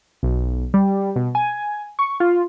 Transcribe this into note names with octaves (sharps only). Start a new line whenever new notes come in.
B1
G3
B2
G#5
C#6
F4